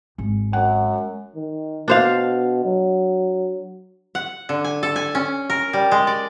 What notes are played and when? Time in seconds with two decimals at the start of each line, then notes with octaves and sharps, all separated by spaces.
0.18 G#1 G#3
0.53 F#2 F#5
1.36 D#3
1.88 B2 D4 C5 F5
2.65 F#3
4.15 F#5
4.49 D3
4.64 G#5
4.83 A4
4.96 G#5
5.15 C#4
5.50 A#4
5.73 G3
5.91 G#3
6.07 D5